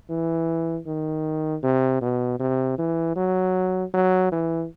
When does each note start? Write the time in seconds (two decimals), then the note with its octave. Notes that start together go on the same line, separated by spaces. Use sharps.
0.09 E3
0.87 D#3
1.63 C3
2.01 B2
2.39 C3
2.78 E3
3.16 F#3
3.94 F#3
4.32 E3